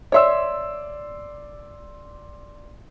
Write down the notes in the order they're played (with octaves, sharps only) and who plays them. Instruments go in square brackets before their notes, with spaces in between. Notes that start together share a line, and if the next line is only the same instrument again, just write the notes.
[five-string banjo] C#5 E5 [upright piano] D5 C6 E6